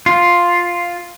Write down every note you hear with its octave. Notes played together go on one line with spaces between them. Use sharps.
F4